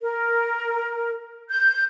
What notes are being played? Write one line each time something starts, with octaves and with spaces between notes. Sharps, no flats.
A#4
G6